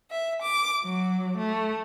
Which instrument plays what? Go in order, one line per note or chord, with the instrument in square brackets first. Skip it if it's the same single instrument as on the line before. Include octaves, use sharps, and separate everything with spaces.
[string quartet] E5
D6
F#3
A3